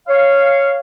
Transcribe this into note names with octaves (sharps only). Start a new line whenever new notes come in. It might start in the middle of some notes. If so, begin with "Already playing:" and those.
C#5 F5